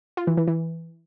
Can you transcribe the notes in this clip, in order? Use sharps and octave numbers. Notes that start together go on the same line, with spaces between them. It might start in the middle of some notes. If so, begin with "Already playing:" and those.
F4
E3
E3
E3